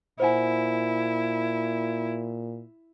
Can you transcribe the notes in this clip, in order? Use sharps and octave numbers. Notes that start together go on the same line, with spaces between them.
A#2 E4 C5 F#5 G#5